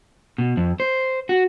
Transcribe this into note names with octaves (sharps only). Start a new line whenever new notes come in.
B2
F2
C5
F#4